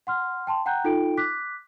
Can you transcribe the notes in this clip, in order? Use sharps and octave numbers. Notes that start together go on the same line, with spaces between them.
F#5 C6 F6
G5 A5 C6
F#5 G5 A#5 F#6 G6
D#4 F4 A4 G5 D7
D6 F#6 B6